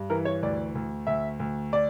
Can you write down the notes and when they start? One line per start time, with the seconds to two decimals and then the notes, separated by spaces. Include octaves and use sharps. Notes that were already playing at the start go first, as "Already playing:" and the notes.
Already playing: G2
0.10 E3 A#4
0.25 C#5
0.43 D2 D5
0.75 D2
1.07 D2 E5
1.40 D2
1.73 D5